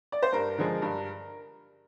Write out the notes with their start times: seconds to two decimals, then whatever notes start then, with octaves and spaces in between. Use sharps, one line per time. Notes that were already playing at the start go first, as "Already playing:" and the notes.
0.12 D5
0.23 C5
0.32 G2 A#4
0.58 D3 F3 G#3
0.82 G2